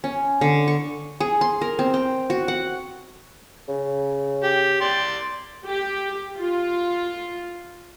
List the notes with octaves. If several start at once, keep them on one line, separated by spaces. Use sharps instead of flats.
C#4
D3
C#6
G#4
C6
A#4
C4
G5
F#4
F#5
C#3
G4
D5 C6
G4
F4